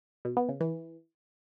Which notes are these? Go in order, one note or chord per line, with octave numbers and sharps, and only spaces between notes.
B2
B3
C#3
E3